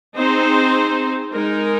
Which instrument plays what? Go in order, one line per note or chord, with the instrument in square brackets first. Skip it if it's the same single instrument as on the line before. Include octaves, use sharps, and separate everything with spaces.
[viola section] C4 D#4 G#4 C5
G#3 D#4 A#4